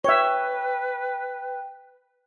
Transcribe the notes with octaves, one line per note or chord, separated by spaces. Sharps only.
B4 C#5 E5 G5